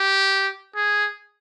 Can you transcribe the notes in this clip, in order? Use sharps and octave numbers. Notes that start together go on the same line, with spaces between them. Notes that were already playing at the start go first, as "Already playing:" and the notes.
Already playing: G4
G#4